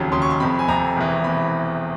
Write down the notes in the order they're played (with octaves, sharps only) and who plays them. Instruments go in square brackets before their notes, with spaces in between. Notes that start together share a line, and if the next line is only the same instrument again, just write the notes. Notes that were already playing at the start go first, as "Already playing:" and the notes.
Already playing: [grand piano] F1 D#2 C#3 F#3
F1 D#2 C#3 F#3 C6
C#6
C6
F1 F2 C3 B5
G#5
F1 F2 C3 A#5
E1 E2 C3 E3
C3 E3 B5